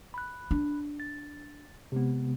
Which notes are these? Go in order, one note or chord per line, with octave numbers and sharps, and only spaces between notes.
B5 F#6
D4
A6
C3 G#3 B3